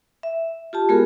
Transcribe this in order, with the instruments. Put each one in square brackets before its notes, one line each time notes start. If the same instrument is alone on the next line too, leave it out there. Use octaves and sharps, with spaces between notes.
[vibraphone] E5
F4 G4 A5
G#3 B3 F4 F#4 G#4 A#4